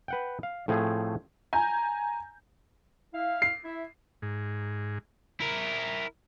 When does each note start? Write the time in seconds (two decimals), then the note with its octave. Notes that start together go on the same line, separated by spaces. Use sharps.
0.08 B4 F#5 G5
0.43 F5
0.68 A2 F3 A3 C4 G#4
1.53 G#5 A#5 G6
3.14 E4 F5
3.42 C7
3.65 E4 E5
4.22 G#2
5.40 E4 A#4